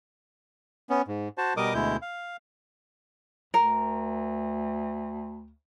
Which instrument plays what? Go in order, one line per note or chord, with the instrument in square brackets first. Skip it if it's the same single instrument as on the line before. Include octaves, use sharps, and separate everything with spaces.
[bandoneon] B3 C#4
G#2
F#4 C5 A5
B2 G3 A#4 D#5 D6 D#6
D2 B2 G#3 E4 G6
F5
[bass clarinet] D2 [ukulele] A#4